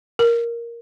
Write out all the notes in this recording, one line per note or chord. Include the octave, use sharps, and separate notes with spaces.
A#4